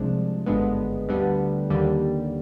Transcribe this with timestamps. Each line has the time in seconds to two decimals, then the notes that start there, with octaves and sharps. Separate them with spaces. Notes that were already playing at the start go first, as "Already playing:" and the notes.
Already playing: C2 C3 F3 G#3 D4
0.46 G#1 G2 D3 G#3 B3
1.08 D2 D3 G3 B3
1.70 D#2 D3 G3